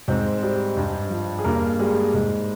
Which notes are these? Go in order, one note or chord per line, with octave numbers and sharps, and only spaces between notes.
G#2 C4 C5
G3
G2
F3
G#4
G2 A#3 A#4
G3 G#3 G#4
G#2